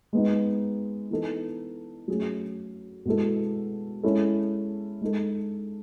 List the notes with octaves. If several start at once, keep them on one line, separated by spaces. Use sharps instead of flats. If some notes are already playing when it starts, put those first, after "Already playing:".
G#3 B3 D#4
E3 B3 D#4 A4
F#3 A3 C#4 G#4
B2 G#3 B3 E4 A4
G#3 C#4 E4 A4
G#3 D#4 A4